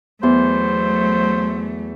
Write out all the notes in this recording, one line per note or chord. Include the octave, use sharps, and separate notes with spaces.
E2 F#3 A3 C5